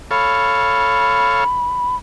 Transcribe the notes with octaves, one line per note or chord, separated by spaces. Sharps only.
A4 C#5 F5 B5